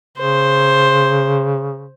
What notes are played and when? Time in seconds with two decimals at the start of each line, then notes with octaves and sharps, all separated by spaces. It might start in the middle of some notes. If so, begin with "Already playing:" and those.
0.18 C#3 C5